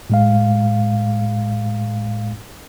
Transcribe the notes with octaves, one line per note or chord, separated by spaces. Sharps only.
A2 G#3 F5